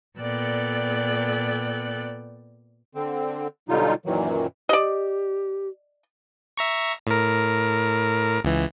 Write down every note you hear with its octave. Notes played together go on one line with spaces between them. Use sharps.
A#2 B3 A4 D5 G5 F#6
D3 C4
B2 D3 F#3 G3 D#4 F4
F#2 A#2 D#3 E3 F#3
G4 D5 D#5
E5 A#5 C#6
A2 A#4
C#2 E3